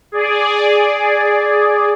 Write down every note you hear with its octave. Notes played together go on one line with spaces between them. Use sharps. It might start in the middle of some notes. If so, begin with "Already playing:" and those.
G#4 D5